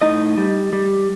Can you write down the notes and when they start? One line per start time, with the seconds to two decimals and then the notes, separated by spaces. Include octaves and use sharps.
0.01 A2 D#4 D#5
0.37 G3
0.73 G3